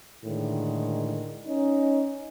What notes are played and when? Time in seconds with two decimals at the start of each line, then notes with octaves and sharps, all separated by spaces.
0.25 A2 D3 D#3 G#3
1.47 C#4 D#4